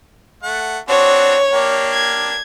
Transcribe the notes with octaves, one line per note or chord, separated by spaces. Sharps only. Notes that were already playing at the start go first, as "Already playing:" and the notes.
A3 F#5
C4 D4 F#4 C#5
A#3 D4 G4
G#6